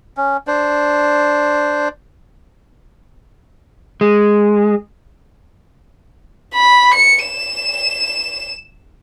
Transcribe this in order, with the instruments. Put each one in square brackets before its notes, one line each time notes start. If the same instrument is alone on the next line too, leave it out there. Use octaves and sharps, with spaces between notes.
[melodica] C#4
D4 C5
[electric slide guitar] G#3
[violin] B5
C#7
E7